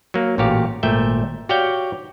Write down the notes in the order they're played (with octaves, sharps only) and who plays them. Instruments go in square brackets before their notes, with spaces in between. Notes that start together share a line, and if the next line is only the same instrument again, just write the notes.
[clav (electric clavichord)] F#3 A#3
A1 A#2 F#4 G4 F5
G#1 A#2 A3 E5 G5
F#4 G4 C#5 D5 F5 G5